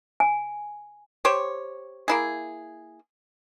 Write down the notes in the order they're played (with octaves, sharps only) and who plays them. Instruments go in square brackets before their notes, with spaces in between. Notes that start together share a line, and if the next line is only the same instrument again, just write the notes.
[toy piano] G#5
[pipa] G4 C5 C#5
A#3 E4 G#4